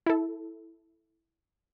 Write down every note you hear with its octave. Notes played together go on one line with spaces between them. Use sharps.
E4 A4